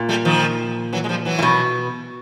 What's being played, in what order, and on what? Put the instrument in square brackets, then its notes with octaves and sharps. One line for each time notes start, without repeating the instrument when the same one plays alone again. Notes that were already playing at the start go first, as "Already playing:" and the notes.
Already playing: [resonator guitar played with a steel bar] A#2
[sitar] G3 A3
D#3 F3
E3 F#3
G#3
F3 G3
E3 F#3
[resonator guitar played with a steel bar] A#2
B2